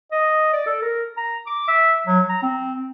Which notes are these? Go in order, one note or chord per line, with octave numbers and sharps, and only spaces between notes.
D#5
D5
A4
A#4
A#5
D6
E5
F#3
A#5
C4